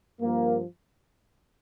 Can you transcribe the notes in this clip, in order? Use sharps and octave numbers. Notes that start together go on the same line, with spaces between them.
G2 F3 A#3